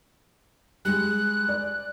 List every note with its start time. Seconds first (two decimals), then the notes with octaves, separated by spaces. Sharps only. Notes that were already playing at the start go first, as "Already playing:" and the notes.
0.85 G3 G#3 F#6
1.49 D5